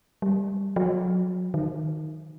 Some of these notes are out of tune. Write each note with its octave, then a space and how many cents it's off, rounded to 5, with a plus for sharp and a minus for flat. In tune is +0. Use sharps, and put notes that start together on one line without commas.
G3 +10
F#3 -25
D#3 +0